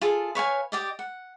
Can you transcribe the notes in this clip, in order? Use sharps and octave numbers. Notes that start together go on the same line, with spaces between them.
F4 G#4 A4
B4 C#5 F5 G#5
G4 D5 D#5
F#5